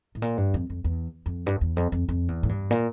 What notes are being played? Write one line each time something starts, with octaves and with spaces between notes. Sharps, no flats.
A2
A#2
G2
F2
F2
E2
F2
G2
E2
F2
F2
F2
E2
A2
G2
A#2